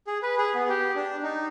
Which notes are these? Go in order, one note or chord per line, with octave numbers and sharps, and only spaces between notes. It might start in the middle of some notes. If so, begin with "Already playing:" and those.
G#4
B4
G#4
B3
G4
D4
D#4